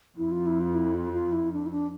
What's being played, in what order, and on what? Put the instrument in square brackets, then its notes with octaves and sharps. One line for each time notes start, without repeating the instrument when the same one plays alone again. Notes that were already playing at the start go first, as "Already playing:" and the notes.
[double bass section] F2 [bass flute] E4
[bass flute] F4
E4
F4
E4
F4
F4
E4
D4
E4
D4